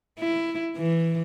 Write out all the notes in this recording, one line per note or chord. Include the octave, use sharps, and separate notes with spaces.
E4
E3